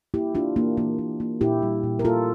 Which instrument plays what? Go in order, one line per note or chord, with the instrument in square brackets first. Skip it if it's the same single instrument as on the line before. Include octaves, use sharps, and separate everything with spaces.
[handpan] A#3 E4 G4
A#3 D4 F4
E3 A#3 D4
E3 A#3
A#3
A#3
A#2 E4 G4
G3
A#2
A#4
A#3 F4 A4